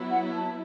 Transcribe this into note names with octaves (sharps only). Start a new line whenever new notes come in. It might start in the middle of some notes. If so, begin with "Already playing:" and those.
Already playing: F#3 B3 E4
F#5
A5